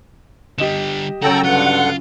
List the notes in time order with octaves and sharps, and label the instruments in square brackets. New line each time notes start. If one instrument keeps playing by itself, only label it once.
[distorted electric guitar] D3 G3 [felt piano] G4 D#5 E7
[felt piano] C#3 F#3 [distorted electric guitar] F#4 [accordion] A4 G5 A#5
[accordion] G2 D3 F#5 [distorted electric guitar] F4